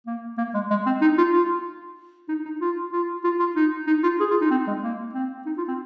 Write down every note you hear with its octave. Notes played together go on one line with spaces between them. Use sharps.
A#3
A#3
G#3
G#3
C4
D#4
F4
F4
D#4
D#4
F4
F4
F4
F4
D#4
D#4
F4
G#4
F4
D#4
C4
G#3
A#3
C4
D#4
F4
C4